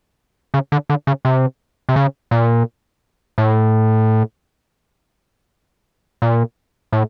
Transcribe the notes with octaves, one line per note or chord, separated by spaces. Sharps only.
C#3
D3
D3
C#3
C3
C3
C#3
A#2
A2
A#2
A2